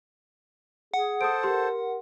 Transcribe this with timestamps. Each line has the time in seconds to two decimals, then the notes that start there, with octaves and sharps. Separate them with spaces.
0.94 G#4 F#5
1.21 A4 C5 D#6 D7
1.43 G4 A#4 C6